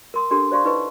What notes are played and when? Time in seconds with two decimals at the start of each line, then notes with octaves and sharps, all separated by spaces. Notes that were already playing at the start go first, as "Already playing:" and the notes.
0.14 A#4 C6 D#6
0.31 C#4 D4 G4 A4 A#4 C6
0.51 C5 D5 F5 C6 C#6
0.64 D#4 E4 B4 D#5 C#6